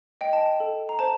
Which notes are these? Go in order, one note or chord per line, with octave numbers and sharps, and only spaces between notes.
D#5 G5
A5
G5
A4
A#5
C5 A5